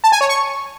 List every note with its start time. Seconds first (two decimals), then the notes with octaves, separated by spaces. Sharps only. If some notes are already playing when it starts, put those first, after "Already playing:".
0.04 A5
0.12 G#5
0.21 C#5
0.29 C#6